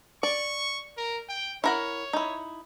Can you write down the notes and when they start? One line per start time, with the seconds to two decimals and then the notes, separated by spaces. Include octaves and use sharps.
0.23 D5 C#6
0.97 A#4
1.29 G5
1.64 E4 A#4 C#5 F#5
2.13 D#4 E4